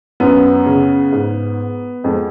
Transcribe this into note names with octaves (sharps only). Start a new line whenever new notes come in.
F#2 B3
C#3
G#2
F2 G#3